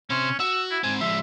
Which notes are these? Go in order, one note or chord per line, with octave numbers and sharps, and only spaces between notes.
C3 C#4 C5
F#4 E6
E4
G#2 C4 G#5
F3 G#3 E5